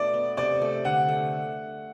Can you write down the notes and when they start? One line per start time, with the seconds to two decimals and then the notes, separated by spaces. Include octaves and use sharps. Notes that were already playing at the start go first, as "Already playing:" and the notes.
Already playing: B2 A3 D4 D5
0.14 B3
0.37 C3 D5
0.62 A3
0.85 D3 F#5
1.09 A3